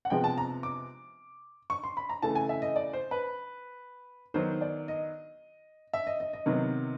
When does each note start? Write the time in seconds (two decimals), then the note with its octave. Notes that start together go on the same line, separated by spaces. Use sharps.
0.05 F#5
0.10 C3 F3 G#3 B3 G5
0.24 A5
0.38 A#5
0.63 D6
1.70 C#6
1.84 C6
1.97 B5
2.09 A#5
2.22 C#3 E3 A3 A5
2.35 G#5
2.49 E5
2.62 D#5
2.76 D5
2.93 C5
3.11 B4
4.34 D#3 F#3 B3 C5
4.61 D5
4.88 D#5
5.93 E5
6.07 D#5
6.20 D#5
6.33 D#5
6.46 C3 D#3 F#3 B3